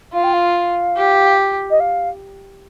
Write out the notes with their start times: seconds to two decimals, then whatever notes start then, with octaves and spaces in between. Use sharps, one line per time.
0.13 F4 F5
0.24 G5
0.34 F5
0.97 G4
1.71 D#5
1.80 F5